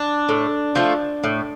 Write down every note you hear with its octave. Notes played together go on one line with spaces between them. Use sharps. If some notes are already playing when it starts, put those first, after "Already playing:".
Already playing: D4
A2
F3 A3
A2